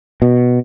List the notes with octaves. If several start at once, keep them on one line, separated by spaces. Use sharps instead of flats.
B2